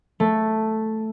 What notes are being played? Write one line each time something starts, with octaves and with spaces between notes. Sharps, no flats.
A3